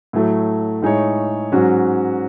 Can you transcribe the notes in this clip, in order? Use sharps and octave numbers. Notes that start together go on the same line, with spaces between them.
A2 F#3 A3
A2 G#3 D#4 G#4 C#5
G#2 F#3 C#4 F#4